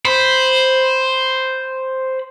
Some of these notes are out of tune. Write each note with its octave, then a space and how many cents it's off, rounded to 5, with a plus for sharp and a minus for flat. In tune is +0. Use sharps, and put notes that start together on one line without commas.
C5 +0 B5 +0